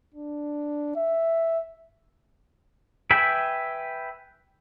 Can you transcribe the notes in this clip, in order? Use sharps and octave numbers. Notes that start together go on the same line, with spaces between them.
D4
E5
B4 E5 G5 G#5 B5